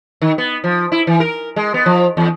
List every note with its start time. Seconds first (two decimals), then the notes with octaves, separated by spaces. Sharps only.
0.22 D#3
0.38 B3
0.64 F3
0.92 E4
1.07 E3
1.20 A#4
1.56 G#3
1.74 B3
1.86 F3
2.17 E2